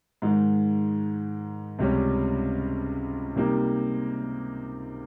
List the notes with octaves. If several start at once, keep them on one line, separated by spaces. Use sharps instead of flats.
G#2 D#3 G#3
C#2 C3 G3 C#4
C3 G3 A#3 D#4 G4